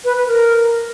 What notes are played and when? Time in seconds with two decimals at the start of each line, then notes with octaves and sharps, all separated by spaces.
0.05 B4
0.15 B4
0.26 A#4